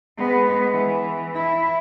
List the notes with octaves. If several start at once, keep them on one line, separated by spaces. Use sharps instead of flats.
G#3 B3
E3
E4